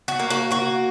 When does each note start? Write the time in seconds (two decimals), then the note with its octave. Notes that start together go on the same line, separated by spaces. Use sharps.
0.08 F#4
0.20 A#3
0.30 F#4
0.51 A#3 F#4